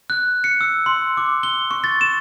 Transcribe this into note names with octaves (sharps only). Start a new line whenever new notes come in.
F#6
C#7
E6
C6
D6
G7
C#6
A6
E7